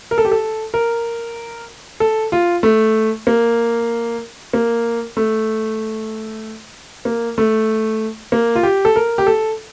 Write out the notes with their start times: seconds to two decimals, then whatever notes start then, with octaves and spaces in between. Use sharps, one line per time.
0.11 A#4
0.18 A4
0.25 G4
0.32 A4
0.74 A#4
2.00 A4
2.32 F4
2.63 A3
3.27 A#3
4.53 A#3
5.17 A3
7.05 A#3
7.38 A3
8.32 A#3
8.55 F4
8.63 G4
8.85 A4
8.96 A#4
9.18 G4
9.27 A4